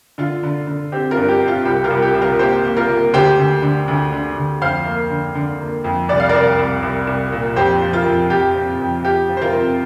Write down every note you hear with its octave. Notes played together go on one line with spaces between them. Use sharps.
D3 F4
D3
D3
C4 G4
F4 A#4
G2
G4
C4
F4
C2 G4
F4 A#4
C2
G4
C2
F4 A#4
A#3 G4 C5
A#3
F4 A#4
A#3
D2 G4 C5
D2
D3
D2
D3
D2
F2 C5 F5
A#3
D3
D3
A#3
F2
C2 D5
F5
C2 A#4 D5
C2
C2
C2
A#2
F2 G4 C5
F3
F4 A#4
F2
F2 G4
C4
F2
F3 G4
F3
C5
F4 A#4
C4